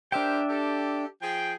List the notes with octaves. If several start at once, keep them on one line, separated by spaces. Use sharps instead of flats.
D4 G4 A#4 C5 E5 G5
G4 A4
F3 G#4 G5